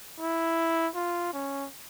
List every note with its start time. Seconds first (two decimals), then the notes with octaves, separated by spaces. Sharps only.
0.20 E4
0.95 F4
1.33 C#4